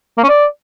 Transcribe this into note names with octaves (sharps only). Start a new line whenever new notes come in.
A#3
C#4
D5